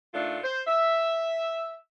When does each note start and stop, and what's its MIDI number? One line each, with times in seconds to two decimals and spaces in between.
0.14 0.39 46
0.14 0.39 57
0.14 0.39 62
0.14 0.39 63
0.14 0.39 65
0.44 0.60 72
0.67 1.74 76